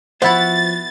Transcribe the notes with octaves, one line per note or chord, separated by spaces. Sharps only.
F3 B3 E4 F#4 C5 E5 B5 A6